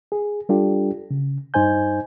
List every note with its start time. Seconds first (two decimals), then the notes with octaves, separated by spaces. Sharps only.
0.12 G#4
0.49 G3 D4 F4 G4 A4
1.11 C#3
1.54 G2 D#4 C5 G#5 G6